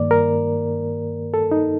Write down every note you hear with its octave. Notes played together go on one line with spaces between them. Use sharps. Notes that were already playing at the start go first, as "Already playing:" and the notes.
Already playing: G2 D#3 A#3 D5
A#4
A4
D#4